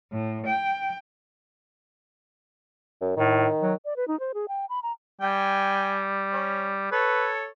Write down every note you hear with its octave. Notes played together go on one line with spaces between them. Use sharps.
A2
G5
F#2
A2 D#3
F#3
D5
B4
D#4
C5
G#4
G5
B5
A#5
G3 G5 G#5
C#4
A4 B4 C#5